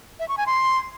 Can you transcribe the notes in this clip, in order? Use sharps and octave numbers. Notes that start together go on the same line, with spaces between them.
E5
C#6
G#5
C6